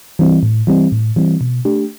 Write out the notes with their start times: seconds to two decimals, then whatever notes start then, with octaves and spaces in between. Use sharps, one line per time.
0.19 E3 G3 C4
0.43 A2
0.67 E3 G3 C4
0.92 A2
1.16 E3 G3 C4
1.41 B2
1.65 A3 D4 G4